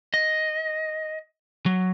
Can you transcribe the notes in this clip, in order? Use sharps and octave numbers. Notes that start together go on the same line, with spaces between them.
D#5
F#3